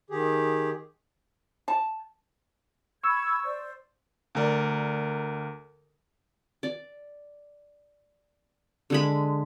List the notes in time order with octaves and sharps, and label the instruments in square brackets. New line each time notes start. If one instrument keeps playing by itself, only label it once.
[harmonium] D#3 G4 G#4
[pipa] A5
[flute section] B5 G#6 [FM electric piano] C#6 E6
[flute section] C5 D5
[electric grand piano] D2 A#4 D5
[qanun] D5
D3 G#3 B5